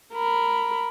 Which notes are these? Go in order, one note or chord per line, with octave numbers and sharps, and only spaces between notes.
A#4 B5